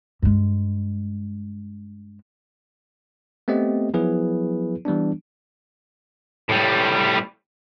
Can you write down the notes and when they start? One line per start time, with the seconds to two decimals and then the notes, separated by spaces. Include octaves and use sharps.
0.22 G2 G#3
3.48 A3 B3 C4 G4 D#5
3.94 F3 F#3 B3 E4 G#4 B4
4.85 E3 G3 B3 D4
6.49 A2 G3